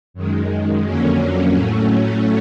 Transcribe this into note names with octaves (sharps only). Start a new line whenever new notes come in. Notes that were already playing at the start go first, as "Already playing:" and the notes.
F#2 D#3 G#3
F2 D3 F#3 A#3 C#4
A2 F#3 A3 C#4